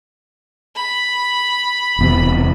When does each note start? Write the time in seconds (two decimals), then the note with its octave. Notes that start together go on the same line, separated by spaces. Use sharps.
0.75 B5
1.99 E1 E2 C3